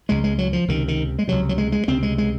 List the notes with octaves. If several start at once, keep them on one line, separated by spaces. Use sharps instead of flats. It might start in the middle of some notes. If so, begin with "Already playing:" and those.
C#2 C#3 G#3
G#3
F#3
F3
C#2 C3 D#3
D#3
G#3
C#2 C3 F#3
F#3
G#3
G#3
C#2 C3 C4
G#3
G#3